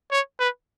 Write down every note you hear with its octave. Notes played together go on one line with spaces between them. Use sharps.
C#5
B4